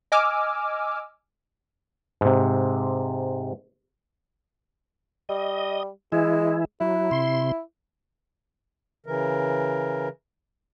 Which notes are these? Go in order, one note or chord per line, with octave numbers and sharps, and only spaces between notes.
D#5 G#5 D6 E6 F6
G#2 C3
G3 D#5
E3 G#3 E4
F#3 E4
C3 C6
C#3 E3 A#4